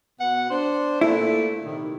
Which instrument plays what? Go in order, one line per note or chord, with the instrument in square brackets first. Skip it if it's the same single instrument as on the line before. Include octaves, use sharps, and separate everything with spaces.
[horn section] B2 B3 F#5
D4 C5
[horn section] A#2 A3 [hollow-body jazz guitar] E4
[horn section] C3 D#3